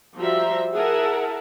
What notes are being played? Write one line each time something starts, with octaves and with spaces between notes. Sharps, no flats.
F3 G3 F#4 E5 A#5 C6
E4 G#4 A#4 E5 F#5 A5